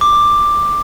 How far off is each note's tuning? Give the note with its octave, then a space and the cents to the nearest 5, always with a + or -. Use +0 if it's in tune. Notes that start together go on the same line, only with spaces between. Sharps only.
D6 +10